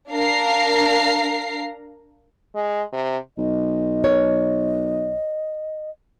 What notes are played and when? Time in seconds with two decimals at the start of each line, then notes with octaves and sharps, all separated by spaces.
0.12 D4 A#4 F5 A#5 C7
2.55 G#3
2.93 C3
3.38 B1 D#5
4.04 A#4 C#5